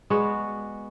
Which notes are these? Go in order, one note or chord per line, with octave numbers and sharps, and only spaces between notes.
G#3 B3 F#4 D5